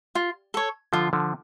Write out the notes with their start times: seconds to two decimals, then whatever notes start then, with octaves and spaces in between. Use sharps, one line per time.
0.15 F4
0.54 A4 C#5
0.93 D3 F3 F4
1.13 D3 F3